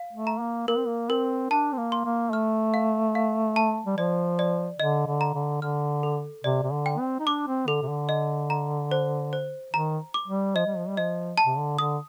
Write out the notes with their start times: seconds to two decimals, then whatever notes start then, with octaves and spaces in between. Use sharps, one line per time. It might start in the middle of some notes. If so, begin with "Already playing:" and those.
Already playing: F5
0.13 A3
0.27 A#5
0.40 A#3
0.68 A#3 A#4
0.77 C4
0.87 A#3
1.10 C4 A#4
1.50 D4 A5
1.73 C4
1.78 A#3
1.92 C6
2.05 A#3
2.32 A3 F6
2.74 F5
3.15 F5
3.56 A5
3.87 G3
3.97 F3 D5
4.39 D5
4.79 D3 D#5
5.07 D3
5.21 A#5
5.34 D3
5.62 D3 F6
6.03 A4
6.44 C3 D5
6.63 C3
6.72 D3
6.86 G5
6.99 C4
7.20 D#4
7.27 D4 D6
7.47 C4
7.67 D3 A4
7.82 C3
7.88 D3
8.09 D#5
8.50 A#5
8.91 C5
9.33 C5
9.74 D#3 A#5
10.14 D6
10.28 G3
10.56 F3 D#5
10.66 G3
10.77 F3
10.88 G3
10.97 F3 D#5
11.38 A5
11.45 C3
11.58 D3
11.79 D3 D#6